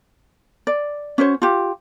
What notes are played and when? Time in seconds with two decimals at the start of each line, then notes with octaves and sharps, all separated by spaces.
0.67 D5
1.18 C#4 F#4 C5 C#5
1.42 F4 G4